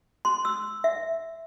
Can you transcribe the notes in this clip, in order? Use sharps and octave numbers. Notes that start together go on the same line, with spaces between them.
C6
E6
E5